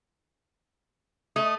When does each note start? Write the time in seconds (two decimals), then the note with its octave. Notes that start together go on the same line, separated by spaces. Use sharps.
1.36 A3 D#5 D#6